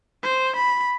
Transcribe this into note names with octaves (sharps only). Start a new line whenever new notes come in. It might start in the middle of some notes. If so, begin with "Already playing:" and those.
C5
B5